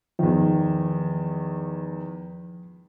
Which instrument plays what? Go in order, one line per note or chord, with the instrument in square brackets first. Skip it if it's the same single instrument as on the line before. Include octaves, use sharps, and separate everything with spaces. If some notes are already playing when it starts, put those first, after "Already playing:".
[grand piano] E2 D#3 [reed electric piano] F3